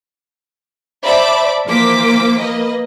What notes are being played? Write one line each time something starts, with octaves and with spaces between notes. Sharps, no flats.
C5 D5 E5 A5 B5 D6
E3 F3 A#3 C5 D6 B6
A#3 B4 D#5